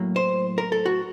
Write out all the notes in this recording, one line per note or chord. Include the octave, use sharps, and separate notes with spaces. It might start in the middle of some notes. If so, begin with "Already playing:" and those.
Already playing: A2 F#3 A#3
C5
A#4
A4
F#4